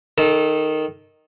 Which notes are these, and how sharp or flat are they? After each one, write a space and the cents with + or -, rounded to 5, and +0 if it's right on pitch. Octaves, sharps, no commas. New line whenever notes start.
D#3 -5 A4 -25